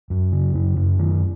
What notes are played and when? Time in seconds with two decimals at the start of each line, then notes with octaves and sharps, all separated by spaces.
0.10 F#2
0.32 C#3
0.55 F#2
0.77 F#2
0.99 D#3